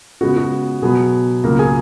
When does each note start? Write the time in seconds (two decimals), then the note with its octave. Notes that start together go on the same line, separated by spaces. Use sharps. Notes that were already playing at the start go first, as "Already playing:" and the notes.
0.21 C#3 G#3 B3 F#4
0.37 F#4
0.82 B2 F#3 B3 G#4
1.44 C#2 C#3 F#3 A#3 A#4
1.59 G#4 G#5